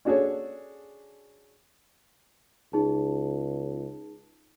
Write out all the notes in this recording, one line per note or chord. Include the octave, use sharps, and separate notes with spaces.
C#4 D4 F#4 G#4 A4 C#5
C#2 D#4 G#4 A5